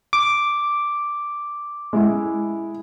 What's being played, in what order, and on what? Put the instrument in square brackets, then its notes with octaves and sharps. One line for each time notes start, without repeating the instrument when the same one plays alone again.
[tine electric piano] D6
[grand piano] G#3 E4